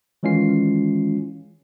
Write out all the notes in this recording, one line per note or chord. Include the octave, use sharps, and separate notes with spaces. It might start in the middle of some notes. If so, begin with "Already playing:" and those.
D#3 E3 G#3 C#4 F4 C7